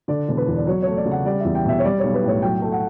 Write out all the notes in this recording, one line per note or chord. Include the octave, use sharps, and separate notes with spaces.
D3 D5
E1
B4
E2
D5
F#3 C#5
A3 C#5
D5
C#3
F#5
G3 D5
E2 E5
G5
B2 E5
C#5
G3 D5
B1 C#5
B4
A2 C#5
F#3 G5
A3
F#5